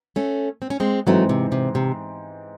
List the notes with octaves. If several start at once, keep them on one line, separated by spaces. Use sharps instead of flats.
A3 C#4
C4
C#4
G#3 C4
G#2 E3 F#3 A3 C4
C3
C3
C3